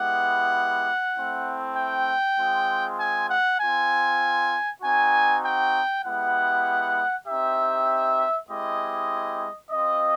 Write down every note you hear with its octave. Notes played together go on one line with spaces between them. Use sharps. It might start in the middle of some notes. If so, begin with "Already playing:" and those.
Already playing: G#3 B3 E4 G4 F#5
A3 C4 E4
G5
G#3 C4 F4
G#5
F#5
C4 F4 G#5
C4 D#4 F#4 G#5
G5
G#3 B3 E4 G4 F#5
C4 D#4 G4 E5
G#3 C4 E4 G4 D#5
C4 F4 D#5